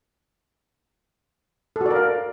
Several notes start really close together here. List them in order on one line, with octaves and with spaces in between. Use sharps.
A4 F#4 D5 A#4 F5